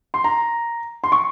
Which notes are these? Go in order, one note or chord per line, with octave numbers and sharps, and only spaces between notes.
C6
A#5
C6
C#6